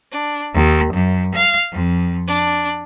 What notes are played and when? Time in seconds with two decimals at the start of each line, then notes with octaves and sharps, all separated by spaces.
0.12 D4
0.54 D#2
0.92 F#2
1.35 F5
1.72 F2
2.28 D4